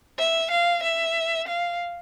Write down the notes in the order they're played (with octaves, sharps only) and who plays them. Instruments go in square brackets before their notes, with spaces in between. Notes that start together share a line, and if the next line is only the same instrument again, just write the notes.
[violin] E5
F5
E5
F5